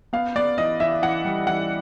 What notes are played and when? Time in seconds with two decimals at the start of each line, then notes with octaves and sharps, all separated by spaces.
0.13 B3 F5
0.36 B3 D5
0.58 E3 D#5
0.80 E3 E5
1.02 E3 F#5
1.25 G3
1.47 E3 F#5